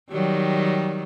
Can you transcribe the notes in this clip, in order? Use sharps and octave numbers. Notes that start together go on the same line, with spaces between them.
D#3 F#3 G3